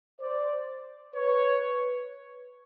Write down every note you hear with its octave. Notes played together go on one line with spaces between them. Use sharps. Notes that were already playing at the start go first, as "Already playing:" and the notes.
C5 D5
B4 C#5